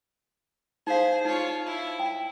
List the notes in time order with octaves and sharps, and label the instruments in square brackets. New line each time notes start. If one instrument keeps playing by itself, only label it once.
[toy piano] D#4 F5 [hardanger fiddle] G#4 C5
[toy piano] D#4 [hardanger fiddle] F4 C#5
[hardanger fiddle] E4
[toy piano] G5